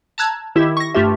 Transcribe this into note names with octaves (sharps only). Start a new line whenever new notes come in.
A5 A#5 E6 F#6 G#6
D#3 E4 G4 E5
C#6 A#6
G2 A3 F4 G4 E5